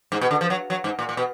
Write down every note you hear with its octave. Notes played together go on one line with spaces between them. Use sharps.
G#2
B2
D3
F3
F#3
F#3
G#2
A#2
A#2
B2